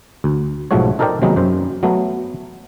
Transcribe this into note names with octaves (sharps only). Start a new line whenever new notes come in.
D2
B1 G#2 F3 A3 F#4 C#5
D#4 A4 A#4 C5 D5 G5
C3 D#3 F#3 G#3 A#3 B3
F#2 C5
F#3 A3 B3